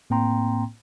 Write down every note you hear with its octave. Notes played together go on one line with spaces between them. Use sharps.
A2 A#3 C4 G5 A#5 C6